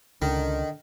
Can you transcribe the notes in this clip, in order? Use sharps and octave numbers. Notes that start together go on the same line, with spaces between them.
C#2 D3 D#3